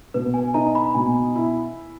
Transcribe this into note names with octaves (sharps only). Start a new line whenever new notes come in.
B2 B4
G#5
D#4 A#5
B5
B2 G#5
E4